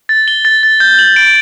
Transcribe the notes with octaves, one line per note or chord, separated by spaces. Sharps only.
A6
G7
A6
A6
G6
F#7
D7